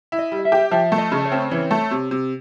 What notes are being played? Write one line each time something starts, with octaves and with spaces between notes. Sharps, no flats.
E4
D#5
G3
E5
G4
F3 E5
A3
D#5
C#3
C#5
C4
E3 C#5
A3
C3
C3